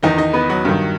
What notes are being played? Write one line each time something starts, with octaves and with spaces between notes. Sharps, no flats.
E2 D#3 D#4 D#5
D#4 D#5
B3 B4
F#3 F#4
G2 D#3